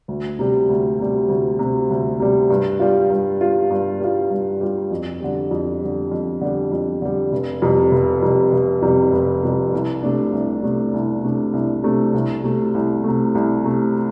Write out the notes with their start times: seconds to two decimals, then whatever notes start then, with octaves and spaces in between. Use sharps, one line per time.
0.08 D2
0.39 C3 G3
0.69 D2
0.99 C3 G3
1.29 D2
1.59 C3 G3
1.90 D2
2.20 C3 G3
2.50 G2
2.80 G3 F4
3.10 G2
3.41 G3 F4
3.70 G2
4.00 G3 F4
4.30 G2
4.61 G3 F4
4.91 F2
5.20 D3 G3
5.51 F2
5.81 D3 G3
6.11 F2
6.41 D3 G3
6.72 F2
7.02 D3 G3
7.32 F1
7.62 F2 C3 G3
7.92 F1
8.22 F2 C3 G3
8.53 F1
8.82 F2 C3 G3
9.12 F1
9.43 F2 C3 G3
9.73 C2
10.03 C3 A3 D4
10.33 C2
10.63 C3 A3 D4
10.94 C2
11.24 C3 A3 D4
11.53 C2
11.83 C3 A3 D4
12.14 C2
12.44 C3 A3
12.74 C2
13.04 C3 A3
13.35 C2
13.64 C3 A3